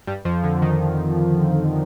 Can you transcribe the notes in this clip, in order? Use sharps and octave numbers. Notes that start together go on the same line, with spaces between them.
G2 G3
F2 F3
D3
D#3